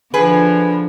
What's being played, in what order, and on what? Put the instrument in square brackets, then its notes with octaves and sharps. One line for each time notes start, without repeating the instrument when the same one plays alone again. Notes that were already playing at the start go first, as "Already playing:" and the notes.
[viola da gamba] D3 F3 [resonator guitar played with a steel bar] G#4 B4